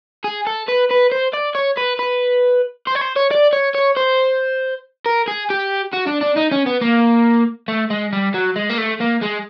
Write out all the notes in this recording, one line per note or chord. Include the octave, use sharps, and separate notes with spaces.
G#4
A4
B4
B4
C5
D5
C#5
B4
B4
C5
C#5
C5
C#5
D5
C#5
C#5
C5
A#4
G#4
G4
F#4
D4
D4
D#4
C#4
B3
A#3
A3
G#3
G3
F#3
G#3
A#3
A3
A#3
G#3